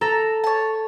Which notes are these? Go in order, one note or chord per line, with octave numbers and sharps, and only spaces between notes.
A4 A#5
C#5 A5